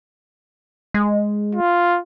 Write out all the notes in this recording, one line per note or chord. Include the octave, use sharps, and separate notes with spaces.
G#3
F4